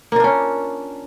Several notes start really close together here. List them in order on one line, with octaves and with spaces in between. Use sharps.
A#3 F4 D4 C#4